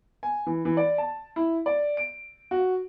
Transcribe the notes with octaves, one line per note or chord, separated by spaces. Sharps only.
G#5
E3
E3
D5
A5
E4
D5
D7
F#4